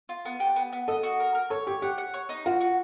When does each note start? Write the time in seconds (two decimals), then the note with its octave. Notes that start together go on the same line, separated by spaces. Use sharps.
0.09 F4
0.25 B3
0.40 G4
0.56 B3
0.73 B3
0.88 A4 D#5
1.03 F#4
1.20 A#4
1.35 A#4
1.50 A4 C#5
1.67 G4 C#5
1.82 G4 F#5
1.98 F#5
2.14 C#5
2.29 D#4
2.46 F4 F#4
2.61 F#4